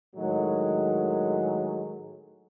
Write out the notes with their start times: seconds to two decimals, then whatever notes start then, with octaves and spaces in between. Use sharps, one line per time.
0.16 A2 D#3 F#3 G#3